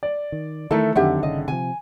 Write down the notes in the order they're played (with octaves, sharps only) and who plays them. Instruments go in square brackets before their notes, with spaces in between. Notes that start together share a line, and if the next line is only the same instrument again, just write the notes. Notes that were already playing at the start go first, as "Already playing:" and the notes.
[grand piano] D5
[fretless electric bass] D#3
[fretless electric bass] D#3 E3 [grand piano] A3 E4 [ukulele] A4 A#4
[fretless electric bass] F2 F#3 C4 [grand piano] D3 D#3 [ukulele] G4 E5 F#5
[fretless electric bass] G1 C#3 [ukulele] D#5
[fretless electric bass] C3 F3 [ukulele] G#5